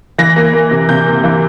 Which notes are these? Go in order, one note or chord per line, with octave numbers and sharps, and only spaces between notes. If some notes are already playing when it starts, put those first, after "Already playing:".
E3 A#6
A#3
A#3
C3
C3 G6
A#3
E3